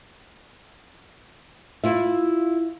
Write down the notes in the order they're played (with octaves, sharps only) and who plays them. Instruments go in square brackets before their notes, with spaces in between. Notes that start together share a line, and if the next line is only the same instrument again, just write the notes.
[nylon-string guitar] E4 F4 E5